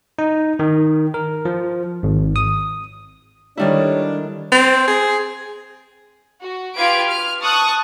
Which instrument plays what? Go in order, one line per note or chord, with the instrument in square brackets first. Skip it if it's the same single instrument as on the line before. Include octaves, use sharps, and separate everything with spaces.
[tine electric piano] D#4
D#3
A#4
F3
G#1
D#6
[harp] D#3 G3 E4 [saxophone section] D4 [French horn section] G4 A4 C#5
[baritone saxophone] C4
G#4
[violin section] F#4
F4 G4 B4 F5 G#6 D7
F6
A5 C#6 D#6 F#6